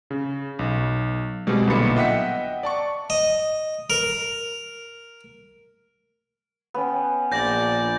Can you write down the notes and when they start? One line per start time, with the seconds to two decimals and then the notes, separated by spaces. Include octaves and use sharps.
0.10 C#3
0.59 B1
1.47 B2 G3 G#3 C4 F#4 G#4
1.67 B1 A#2 D3 B3 B5 C#7
1.96 D#5 E5 F#5 G5 B6 C#7
2.63 D5 A5 C#6
3.10 D#5
3.90 A#4
6.74 B3 C#4 G5
7.32 A#1 D5 G6 A#6